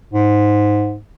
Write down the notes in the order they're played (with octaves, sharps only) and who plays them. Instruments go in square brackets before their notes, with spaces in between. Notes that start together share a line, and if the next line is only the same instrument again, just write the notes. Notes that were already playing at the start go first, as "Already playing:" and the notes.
[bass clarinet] G#2